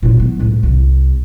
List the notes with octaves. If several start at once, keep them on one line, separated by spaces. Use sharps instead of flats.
A#2 E4
F#3 B3
C#2 A2
C2